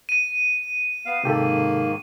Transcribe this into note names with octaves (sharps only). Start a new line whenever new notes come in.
D#7
B3 F5
G#2 C3 D#3 A#3 G4 A4